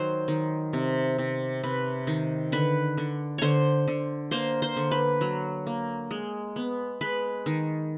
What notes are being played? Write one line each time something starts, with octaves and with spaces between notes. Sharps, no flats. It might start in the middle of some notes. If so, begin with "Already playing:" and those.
Already playing: D#3 F#3 C5
D#3
C3
C3
C3 B4
D#3
D3 B4
D3
D3 C5 C#5
D3
A#3 C5
C5
D3
B4
F#3
A#3
G#3
B3
G#3 B4
D#3